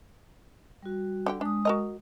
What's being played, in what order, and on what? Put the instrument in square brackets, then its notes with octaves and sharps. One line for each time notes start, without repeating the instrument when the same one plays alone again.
[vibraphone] G3 F#4
[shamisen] D3 G4 G5
[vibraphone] G#3 D#6 [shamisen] D4
[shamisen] F#4 A#4 D#5